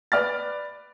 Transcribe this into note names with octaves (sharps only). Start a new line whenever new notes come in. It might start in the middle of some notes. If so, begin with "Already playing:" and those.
B4 D5 F6 A6